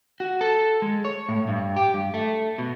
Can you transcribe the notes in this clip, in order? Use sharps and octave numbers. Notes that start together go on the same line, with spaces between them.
F#4
A4
G#3
C#5
A2
G2
G4
G2
A3
B2